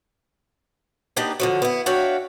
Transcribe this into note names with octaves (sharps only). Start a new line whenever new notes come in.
A#3 B3 D4 D#4 G4
D3 F3 F#3
B3 E4
D4 F#4 C#5 E5 F5 G5